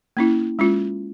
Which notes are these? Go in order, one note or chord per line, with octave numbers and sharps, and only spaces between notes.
A#3 C#4 E4
G#3 C#4 F4